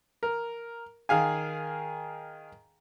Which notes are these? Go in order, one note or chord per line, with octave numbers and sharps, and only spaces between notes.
A#4
D#3 G#4 F5 G#5